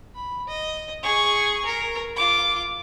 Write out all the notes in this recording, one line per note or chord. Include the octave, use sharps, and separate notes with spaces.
B5
D#5
G#4 C#6
A#4
F4 D6